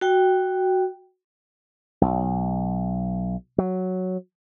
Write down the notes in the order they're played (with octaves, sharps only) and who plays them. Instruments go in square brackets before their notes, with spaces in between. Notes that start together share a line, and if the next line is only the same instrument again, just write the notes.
[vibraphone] F#4 G5
[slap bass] B1
F#3